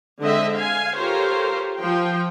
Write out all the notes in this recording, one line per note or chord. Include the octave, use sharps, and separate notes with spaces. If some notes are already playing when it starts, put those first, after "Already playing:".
D3 G#3 C4 D#5 E5
F5 G#5
F4 G4 A4 A#4 C5 C#5
F3 G5